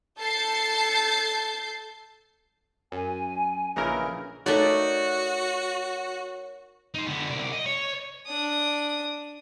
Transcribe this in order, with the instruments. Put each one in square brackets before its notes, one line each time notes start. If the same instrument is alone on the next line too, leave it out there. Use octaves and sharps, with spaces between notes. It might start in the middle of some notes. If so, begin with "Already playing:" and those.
[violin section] A4 A5 G6 A6 C7
[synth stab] F#2 [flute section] G#5
[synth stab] A#1 A#4 [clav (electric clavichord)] C#3 E3 D#4
[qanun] A3 D#4 D5 [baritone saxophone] F#4 [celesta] A#4 C#5
[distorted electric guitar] D#4 C5
D3 B3
C2 D5
D#5
C#5
[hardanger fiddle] D4 D#6